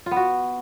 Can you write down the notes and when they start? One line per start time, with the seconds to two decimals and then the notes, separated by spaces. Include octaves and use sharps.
0.06 F4
0.11 B3
0.16 F#4